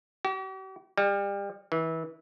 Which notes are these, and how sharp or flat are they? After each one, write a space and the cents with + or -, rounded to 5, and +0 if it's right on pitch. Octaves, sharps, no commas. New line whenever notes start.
G4 -45
G3 +30
E3 -25